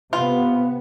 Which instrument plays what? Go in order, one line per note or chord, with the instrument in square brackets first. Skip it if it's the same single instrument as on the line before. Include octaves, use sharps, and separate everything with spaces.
[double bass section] C3 B3 [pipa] F4